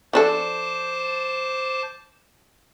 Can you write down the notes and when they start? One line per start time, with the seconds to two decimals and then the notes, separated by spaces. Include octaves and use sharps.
0.13 F3 D4 A4 C5 A5 D6